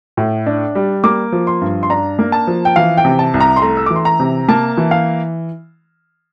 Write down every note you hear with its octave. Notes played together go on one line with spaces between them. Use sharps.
A2
D4
G3
A#3 D6
F3
C6
G2
C6
D4 A#5
A#3
A5
F3
G5
E3 F5
G5
C3
A5
C2
A#5
C6
A3 A#5
E6
E3 D6
C6
A#5
C3
A#3 A5
E3
F5